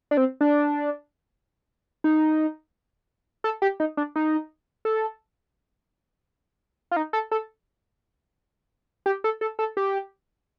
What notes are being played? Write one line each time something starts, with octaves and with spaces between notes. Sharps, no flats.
D4
C4
D4
D#4
A4
G4
D#4
D4
D#4
A4
F4
D#4
A4
A4
G4
A4
A4
A4
G4